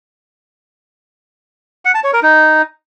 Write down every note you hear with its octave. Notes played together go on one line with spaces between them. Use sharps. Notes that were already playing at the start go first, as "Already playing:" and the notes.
F#5
A5
C#5
A#4
D#4